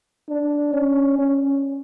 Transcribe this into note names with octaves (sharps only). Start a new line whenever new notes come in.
D4
C#4
C#4